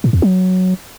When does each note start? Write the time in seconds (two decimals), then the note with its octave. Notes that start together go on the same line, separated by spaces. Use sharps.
0.04 A2
0.13 E2
0.22 F#3